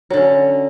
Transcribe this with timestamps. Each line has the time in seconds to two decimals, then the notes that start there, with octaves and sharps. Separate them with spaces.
0.10 F#3
0.14 D3
0.17 C#4